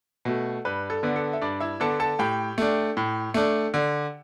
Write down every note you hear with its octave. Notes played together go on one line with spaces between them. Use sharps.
B2 A3
G2 B4
A4
D3 B3 D4
A4
E5
G2 D4 D5
E4 E5
D3 B3 D4 A4 A5
A4 A5
A2 G4 G5
A3 D4
A2
A3 D4
D3